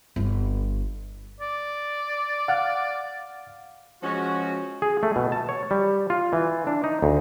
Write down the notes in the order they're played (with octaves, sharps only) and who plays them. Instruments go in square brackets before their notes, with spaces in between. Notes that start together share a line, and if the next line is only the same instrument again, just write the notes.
[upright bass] G1 F4
[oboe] D5
[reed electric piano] F5 F#5 F6
[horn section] F3 G#3 C#4 [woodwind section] F#4
[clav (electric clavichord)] G#4
A3
B2
A5
C#5
G3
F4
E3
D4
D#4
D2